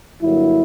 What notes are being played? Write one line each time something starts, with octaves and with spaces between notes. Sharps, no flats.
G2 D3 F#3 A#3 E4